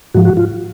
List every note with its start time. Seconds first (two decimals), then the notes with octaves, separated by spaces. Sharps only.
0.14 G#2 F3 F#4
0.25 F#4
0.37 F4